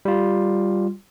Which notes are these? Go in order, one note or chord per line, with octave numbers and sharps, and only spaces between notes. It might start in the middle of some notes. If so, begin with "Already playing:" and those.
G3 F4